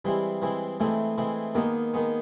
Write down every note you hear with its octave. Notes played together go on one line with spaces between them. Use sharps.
E3 G3 G#3 C4 E4
E3 G#3 C4 E4
E3 G#3 A3 C4 E4
E3 G#3 C4 E4
D#3 G#3 A#3 B3
D#3 G#3 B3